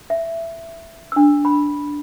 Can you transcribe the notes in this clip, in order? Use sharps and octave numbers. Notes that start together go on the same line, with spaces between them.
E5
D4 E6
B5